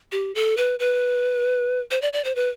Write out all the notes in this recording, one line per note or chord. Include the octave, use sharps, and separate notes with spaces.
G4
A4
B4
B4
C5
D5
D5
C5
B4